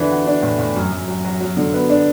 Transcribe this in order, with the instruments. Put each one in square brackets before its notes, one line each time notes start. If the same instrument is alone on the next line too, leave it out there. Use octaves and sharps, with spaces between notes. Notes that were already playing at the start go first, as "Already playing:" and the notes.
Already playing: [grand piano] D3 E3 D4
F#4
D4
A2
A2
F#2
F#2
F#3
F#3
F#3
D3
B3
D4